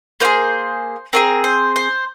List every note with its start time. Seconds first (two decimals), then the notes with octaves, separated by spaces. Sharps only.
0.20 A#3 F4 C5
0.25 G#4
1.13 C4 F4 G#4 A#4
1.44 C5
1.76 C5